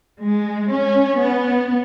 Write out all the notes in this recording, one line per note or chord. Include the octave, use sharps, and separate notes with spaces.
G#3
C#4
B3